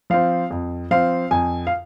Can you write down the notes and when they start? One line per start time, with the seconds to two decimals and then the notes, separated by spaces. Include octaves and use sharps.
0.10 F3 C4 F5
0.51 F2
0.91 F3 C4 F5
1.31 F2 G#5
1.67 F5